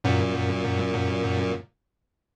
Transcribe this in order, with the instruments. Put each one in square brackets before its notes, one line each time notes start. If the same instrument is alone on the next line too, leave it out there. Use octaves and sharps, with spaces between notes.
[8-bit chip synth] F#2 A#2